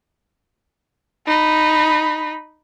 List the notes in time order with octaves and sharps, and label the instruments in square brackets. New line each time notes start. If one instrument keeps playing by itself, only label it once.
[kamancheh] D#4 B5